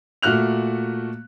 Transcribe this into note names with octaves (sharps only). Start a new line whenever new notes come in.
A#2 A3 F#4 F6 F#6 F7